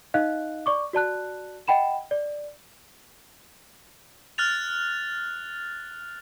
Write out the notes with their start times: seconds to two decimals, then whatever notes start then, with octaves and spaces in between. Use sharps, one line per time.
0.14 D#4 D#5 F5 F#6
0.66 D5 C#6 D6
0.93 F#4 D5 A5 F#6
1.68 D#5 F#5 G5 B5 E7
2.11 D5
4.38 F6 F#6 A6 F7